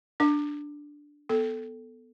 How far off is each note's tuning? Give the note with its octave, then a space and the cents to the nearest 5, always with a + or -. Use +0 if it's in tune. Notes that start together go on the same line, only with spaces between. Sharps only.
D4 +0 D6 +25
B3 +0 A4 +0